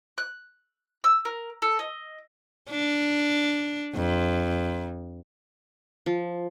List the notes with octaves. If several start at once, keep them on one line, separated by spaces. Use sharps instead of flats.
F#6
E6
A#4
A4
D#5
D4
F2
F3